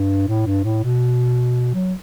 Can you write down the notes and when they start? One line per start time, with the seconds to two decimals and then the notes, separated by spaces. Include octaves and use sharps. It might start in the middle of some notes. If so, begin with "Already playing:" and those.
Already playing: G2
0.28 A2
0.46 G2
0.64 A2
0.84 B2
1.74 F#3